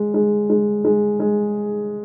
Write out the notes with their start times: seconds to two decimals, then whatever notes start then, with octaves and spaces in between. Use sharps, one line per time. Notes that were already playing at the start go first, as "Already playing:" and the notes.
Already playing: G#3
0.14 G#3
0.50 G#3
0.85 G#3
1.20 G#3